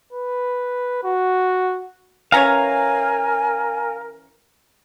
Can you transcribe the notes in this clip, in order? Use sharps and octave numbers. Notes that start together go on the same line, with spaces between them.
B4
F#4
E3 C#4 A#4 C#5 F5 G#5 A#5